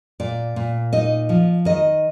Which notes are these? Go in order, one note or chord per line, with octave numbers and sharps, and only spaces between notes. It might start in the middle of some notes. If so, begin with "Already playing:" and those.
A#2 D5
A#2
D#4 D#5
F3
D#3 D#5